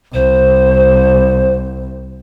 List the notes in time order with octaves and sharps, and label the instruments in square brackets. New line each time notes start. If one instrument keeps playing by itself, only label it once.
[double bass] C2 [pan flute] C5